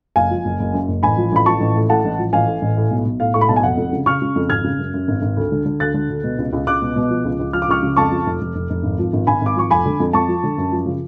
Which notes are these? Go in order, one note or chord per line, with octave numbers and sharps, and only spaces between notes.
F#1 F5 G#5
F3
F#1
F#1
F#2
F#1
A1 G#5 B5
F3
A1 B5
F3 A5 C#6
A1
A2
A2 F#5 A5
A1
F3
A1 F5 G#5
A2
A1
A2
B1
B1
A2 F5
A2 C#6
B5
B1 A5
G#5
F1 F#5
F2
C#3
C#3 C#6 F6
C#3
F2
G#1 F6 G#6
C#3
F#2
F#2
G#1
G#1
D2
D3
D3
D2 F#6 A6
D3
D2
B2
C#2
C#2
C#2 D6 F#6
B2
B2
F3
C#2
C#2
F3 F6
D6
C#2 C#6 F6
C#3
F2 A5 C#6
F3
F1
F1
F1
F1
G#1
F3
G#1
G#1 G#5 B5
G#1 D6
F3 C#6
F1 G#5 B5
D3
F2
F2 A5 C#6
F3
D3
F#2
F3
C#3